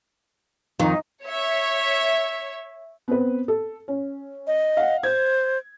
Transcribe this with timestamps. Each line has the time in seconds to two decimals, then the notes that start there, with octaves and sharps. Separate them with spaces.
0.79 F2 D#3 D#4
1.24 C#5 E5
3.08 B3 C4 B4
3.48 A4
3.88 C#4
4.47 D#5
4.77 F5 F#5
5.03 C5 G#6